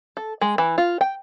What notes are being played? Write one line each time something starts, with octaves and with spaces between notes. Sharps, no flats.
A4
G#3
E3
F4
G5